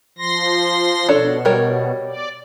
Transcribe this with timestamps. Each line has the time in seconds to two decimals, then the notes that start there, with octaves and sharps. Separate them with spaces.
0.18 F3 C6 A#6
1.08 B2 D4 A4 C#5
1.45 G3 A#4 C#5
2.06 D5